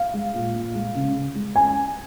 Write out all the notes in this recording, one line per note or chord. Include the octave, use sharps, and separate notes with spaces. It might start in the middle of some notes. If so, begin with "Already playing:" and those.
Already playing: F5
G#3
A#2
A#2
G#3
C#3
C#3
G#3
C#4 G#5